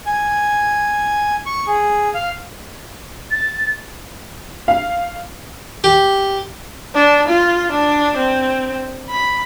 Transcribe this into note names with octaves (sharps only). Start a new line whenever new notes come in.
G#5
C#6
G#4
F5
A6
F5
G4
D4
F4
D4
C4
B5